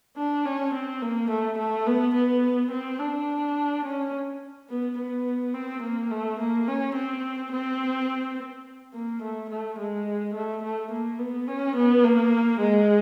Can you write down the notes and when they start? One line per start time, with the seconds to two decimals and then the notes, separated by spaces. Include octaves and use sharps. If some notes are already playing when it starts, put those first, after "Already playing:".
0.17 D4
0.45 C#4
0.74 C4
1.02 A#3
1.30 A3
1.58 A3
1.87 B3
2.14 B3
2.71 C4
2.99 D4
3.85 C#4
4.70 B3
4.98 B3
5.54 C4
5.82 A#3
6.11 A3
6.39 A#3
6.67 C#4
6.95 C4
7.52 C4
8.94 A#3
9.22 A3
9.50 A3
9.79 G#3
10.34 A3
10.62 A3
10.91 A#3
11.19 B3
11.48 C#4
11.76 B3
12.04 A#3
12.60 G#3